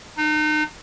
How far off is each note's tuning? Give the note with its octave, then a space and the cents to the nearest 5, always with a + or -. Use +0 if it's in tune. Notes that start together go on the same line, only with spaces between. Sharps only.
D#4 -35